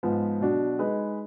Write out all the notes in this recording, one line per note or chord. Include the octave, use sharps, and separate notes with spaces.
G#2 F3 B3
B2 F#3 D4 F#4
G#3 D#4 G#4 B4